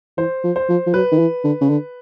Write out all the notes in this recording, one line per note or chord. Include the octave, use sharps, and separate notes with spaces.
E3 C5
F3
C5
F3
F3
F#3 B4
D#3
E3
D3
C#3
D3